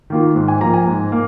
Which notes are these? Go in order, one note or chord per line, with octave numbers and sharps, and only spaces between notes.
D#3 A#3 F4
G#2
G#5
F3 A#3 A#5
G#5
G#2
A#3